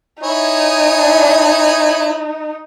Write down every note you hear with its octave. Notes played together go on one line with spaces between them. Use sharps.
D#4 E4 C#5 G#5